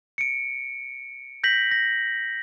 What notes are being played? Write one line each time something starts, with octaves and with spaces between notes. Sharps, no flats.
C#7 D7
G6 A#6 B6 F#7
A#6